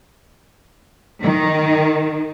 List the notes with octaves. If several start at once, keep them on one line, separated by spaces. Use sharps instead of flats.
D#3